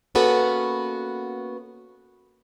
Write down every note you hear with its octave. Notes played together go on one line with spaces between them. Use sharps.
A#3 B3 C#4 F#4 A4 B4